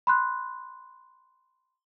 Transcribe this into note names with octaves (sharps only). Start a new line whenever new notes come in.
B5 C6 F#6